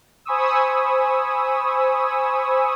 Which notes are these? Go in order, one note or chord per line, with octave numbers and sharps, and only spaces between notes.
C5 G#5 B5 C#6 D#6 E6